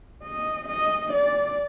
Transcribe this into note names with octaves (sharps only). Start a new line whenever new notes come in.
D#5
D#5
D5